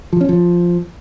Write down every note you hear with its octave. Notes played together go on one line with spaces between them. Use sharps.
F3
C#4
F3